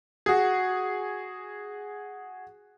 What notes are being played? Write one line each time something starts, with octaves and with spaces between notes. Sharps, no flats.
F#4 G#4